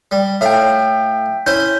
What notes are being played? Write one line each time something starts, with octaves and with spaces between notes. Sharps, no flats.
G3
A2 E5 F5 G5
C#4 E4 C5 G6